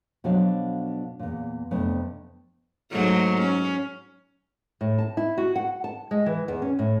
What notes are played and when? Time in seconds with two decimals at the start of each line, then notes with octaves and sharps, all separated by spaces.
0.24 B2 F3 F#3 D4 A4 F5
1.19 E2 A#2
1.71 F2 C3 A3 B3 D4
2.91 G#2 F#3 A3
3.39 C#4
4.81 A2
4.98 A5
5.17 E4
5.38 F#4
5.56 F#5
5.84 A5
6.11 G#3
6.26 E3
6.48 E2
6.62 C#4
6.79 A2